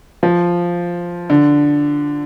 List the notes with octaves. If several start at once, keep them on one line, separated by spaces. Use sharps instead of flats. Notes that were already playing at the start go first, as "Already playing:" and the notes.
F3
D3